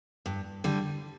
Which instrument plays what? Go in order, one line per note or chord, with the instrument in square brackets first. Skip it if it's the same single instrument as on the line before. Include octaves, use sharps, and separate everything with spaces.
[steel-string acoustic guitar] G2
D3 G3